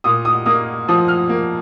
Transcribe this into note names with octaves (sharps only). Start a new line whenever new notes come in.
A#2 D#6
D#6
A#3 D#6
F3 D#6
F6
A#3